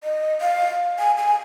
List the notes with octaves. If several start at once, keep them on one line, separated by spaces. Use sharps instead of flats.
D#5
F5
G#5
G#5